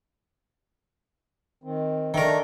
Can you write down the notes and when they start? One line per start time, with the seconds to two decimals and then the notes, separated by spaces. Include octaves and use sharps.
1.64 D#3 C4
2.14 D#3 A3 D4 A#4